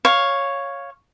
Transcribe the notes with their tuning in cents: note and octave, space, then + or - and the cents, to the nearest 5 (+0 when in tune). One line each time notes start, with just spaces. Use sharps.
C#5 +0 F5 +5